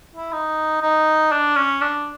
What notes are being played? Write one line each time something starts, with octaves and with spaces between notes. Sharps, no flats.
E4
D#4
D#4
D4
C#4
D4